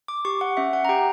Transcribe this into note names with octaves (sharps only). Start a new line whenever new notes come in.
D6
G4 C#6
F#5
C#4 E5
F#5
A#5
G4 G5